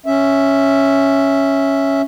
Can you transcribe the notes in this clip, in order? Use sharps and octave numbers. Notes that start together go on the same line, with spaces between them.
C#4 E5